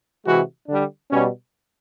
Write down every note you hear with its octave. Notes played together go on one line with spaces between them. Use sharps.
C3 E3 G#3 F#4
D3 G3 D4
B2 G3 C#4